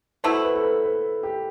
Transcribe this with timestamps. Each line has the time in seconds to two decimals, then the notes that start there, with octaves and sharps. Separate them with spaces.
0.24 B2 A3 E4 C5
0.44 B4
0.55 A4
0.63 B4
0.84 B4
1.23 G4